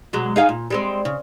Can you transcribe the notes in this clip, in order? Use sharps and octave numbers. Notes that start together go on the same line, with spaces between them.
B2 F#3 G#3
D#4 G#4 F5
A#2
G3 G#3 C4
C#3